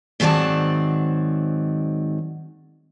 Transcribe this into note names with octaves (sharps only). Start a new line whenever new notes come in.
G#2 D#3 F#3 C4 D5 A5